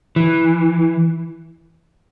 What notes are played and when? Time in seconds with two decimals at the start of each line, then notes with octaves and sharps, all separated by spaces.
0.16 E3